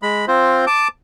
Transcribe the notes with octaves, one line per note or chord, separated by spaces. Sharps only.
G#3 B5
C4 F4 C5
A5 D6